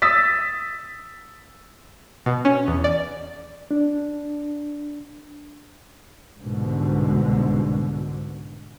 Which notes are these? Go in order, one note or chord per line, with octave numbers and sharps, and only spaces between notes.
D#6 E6 A6 B6
B2
C#4
E2
D5
D4
C2 G#2 B2 D3